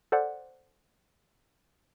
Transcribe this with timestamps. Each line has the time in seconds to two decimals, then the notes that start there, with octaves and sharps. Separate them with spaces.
0.12 A4 C5 D5 F#5